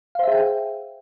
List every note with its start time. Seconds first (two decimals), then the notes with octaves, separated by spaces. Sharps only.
0.15 F5
0.19 C5
0.23 E5
0.28 G#4
0.32 G5